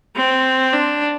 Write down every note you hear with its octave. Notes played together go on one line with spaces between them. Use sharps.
C4
D4